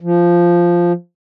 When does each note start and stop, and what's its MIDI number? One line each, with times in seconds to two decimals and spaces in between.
0.01 0.92 53